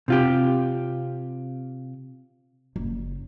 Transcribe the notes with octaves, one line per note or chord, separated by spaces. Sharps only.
C3 F4 G4
F#1